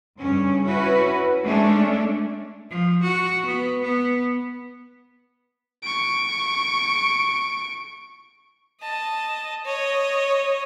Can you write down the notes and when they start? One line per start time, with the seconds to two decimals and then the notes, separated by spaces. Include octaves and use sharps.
0.17 G2 C#3 C#4
0.64 C#4 E4 F#4 B4
1.43 G#3 A3 C#4 D4 C#5
2.71 F3
3.03 F#4
3.46 B3
3.83 B3
5.83 C#6 D7
8.81 D#5 A5
9.65 C#5 D#5